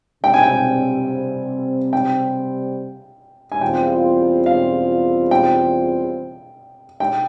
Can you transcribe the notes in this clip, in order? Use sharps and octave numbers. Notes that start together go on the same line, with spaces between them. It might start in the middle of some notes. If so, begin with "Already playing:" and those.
C3 G3 C4 G5
G#5
G5
G5
G#5
E2 C#3 G3 C4 F4 G5
F5
G5
G5